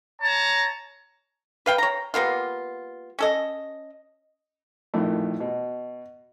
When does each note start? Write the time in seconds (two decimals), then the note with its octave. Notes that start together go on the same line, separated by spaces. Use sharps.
0.22 C#5 A5 A#5
1.66 B4 F5 G5
1.78 C#5 A#5
2.14 G3 A#3 B3 F4
3.19 C#4 A4 D#5
4.94 A#1 F2 A2 D#3 A3
5.40 B2